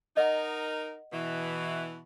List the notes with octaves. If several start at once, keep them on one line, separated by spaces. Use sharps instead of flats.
D#4 A#4 D#5 F#5
B2 E3